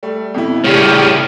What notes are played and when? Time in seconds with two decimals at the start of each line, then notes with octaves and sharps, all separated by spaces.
0.03 G3 A3
0.34 F2 B2 E4
0.64 A2 C#3 G3 G4 C#5 F6